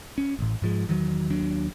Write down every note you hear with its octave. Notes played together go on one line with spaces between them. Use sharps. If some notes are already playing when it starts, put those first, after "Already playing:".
C#4
A1 A2
G#2 F3 G#3
E2 D#3 F3 F#3
D#2 F#3 D4